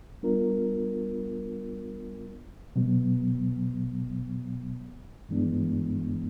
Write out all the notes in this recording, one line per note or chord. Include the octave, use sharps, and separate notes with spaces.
G3 B3 D4 F4 A#4
B2 F#3 B3
G2 E3 G#3 B3 D4